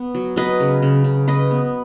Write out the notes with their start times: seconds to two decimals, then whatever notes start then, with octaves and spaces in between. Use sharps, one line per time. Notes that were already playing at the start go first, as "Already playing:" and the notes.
Already playing: B3
0.15 F#3
0.36 F#3 B4 D#5
0.60 C#3
0.82 C#3
1.04 C#3
1.28 C#3 B4 D#5
1.51 B3